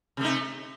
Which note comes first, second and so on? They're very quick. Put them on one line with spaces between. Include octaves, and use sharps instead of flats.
C3 A3 D#4